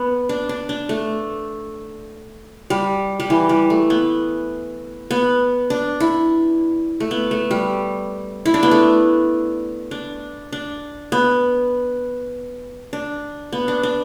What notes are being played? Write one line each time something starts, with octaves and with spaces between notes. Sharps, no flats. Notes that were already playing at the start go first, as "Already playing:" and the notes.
Already playing: B3
D4
D4
D4
A3
G3
G3
E3
G3
A3
B3
B3
D4
E4
A3
B3
A3
G3
E4
D4
B3
A3
D4
D4
B3
D4
B3
D4
D4